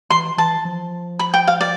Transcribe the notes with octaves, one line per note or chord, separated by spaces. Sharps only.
E3 C6
E3 A5
F3
B5
G5
F5
D5